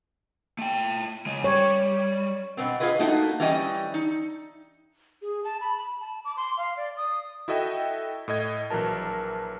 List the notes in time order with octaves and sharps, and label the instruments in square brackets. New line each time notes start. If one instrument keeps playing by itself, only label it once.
[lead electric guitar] A3 G5
C#3 G#3
[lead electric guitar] G3 [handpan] C#5
[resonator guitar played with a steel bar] B2 B3 C4
F4 G#4 B4 D#5
A3 A#3 D#4 F#4
E3 G3 C#4 G4 D#5 G#5
D#4
[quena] G#4
A5
B5
B5
A5
D6
C6
F5
D5
D#6
[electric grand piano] E4 F#4 A4 D#5 E5 G5
A2 A4 D#5 G#6
A#1 E3 F#3 A#4 A5